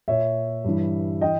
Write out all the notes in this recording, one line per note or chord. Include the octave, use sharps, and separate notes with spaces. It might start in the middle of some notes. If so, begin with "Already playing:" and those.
A#2 C#5 E5
G2 E3
E3 D#5 G5